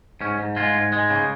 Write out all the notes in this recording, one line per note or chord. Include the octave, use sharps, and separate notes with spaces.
G#2 C#4
G#2
G#3 F4
G#2
G#3
C#3